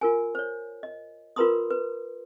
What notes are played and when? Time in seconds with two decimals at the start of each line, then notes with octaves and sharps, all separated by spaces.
0.01 F4 A#4 G#5
0.35 C5 C#5
0.83 D#5
1.36 F4 A#4 B4 A#5 C6 D#6
1.70 B4